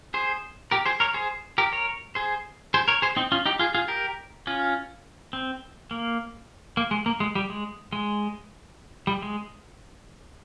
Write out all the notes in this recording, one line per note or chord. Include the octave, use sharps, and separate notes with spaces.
G#4 C5
G4 A#4
G#4 C5
A#4 C#5
G#4 C5
G4 A#4
A#4 C#5
G#4 C5
G#4 C5
A#4 C#5
G#4 C5
C4 D#4
C#4 F4
D#4 G4
F4 G#4
F4 G#4
G4 A#4
C#4 F4
C4
A#3
A#3
G#3
A#3
G#3
G3
G#3
G#3
G3
G#3